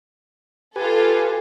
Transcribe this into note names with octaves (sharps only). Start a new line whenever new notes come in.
F4 G4 A4 B4 G#5